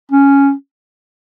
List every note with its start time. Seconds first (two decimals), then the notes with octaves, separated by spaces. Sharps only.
0.12 C#4